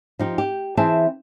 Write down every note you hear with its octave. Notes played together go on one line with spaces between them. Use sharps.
F3 D#4 G4
G4
E3 C4 G#4 E5 A5